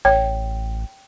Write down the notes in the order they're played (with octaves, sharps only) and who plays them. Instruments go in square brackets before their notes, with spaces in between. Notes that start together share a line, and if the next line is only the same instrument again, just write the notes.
[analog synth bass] A1 [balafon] C#5 [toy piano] G5